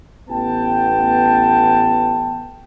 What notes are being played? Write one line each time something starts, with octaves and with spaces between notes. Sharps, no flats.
A1 B3 G5 A5